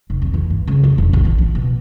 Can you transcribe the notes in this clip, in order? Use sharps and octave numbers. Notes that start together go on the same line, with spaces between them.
F1
F2
E3
G2
C#2
F2
E1
A#1
E3
F3
B2